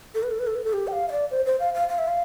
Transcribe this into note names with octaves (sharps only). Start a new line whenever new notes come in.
A4
B4
A4
B4
A4
B4
A4
G4
G5
F5
E5
D5
C5
C5
F5
F5
F5
E5
F5